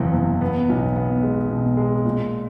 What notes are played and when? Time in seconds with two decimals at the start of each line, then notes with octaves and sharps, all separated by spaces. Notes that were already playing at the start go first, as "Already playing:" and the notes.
Already playing: F#1 E2 C3
0.14 E2
0.41 B3
0.69 B1
0.96 B3
1.23 G#3
1.50 B2
1.77 G#3
2.05 A#2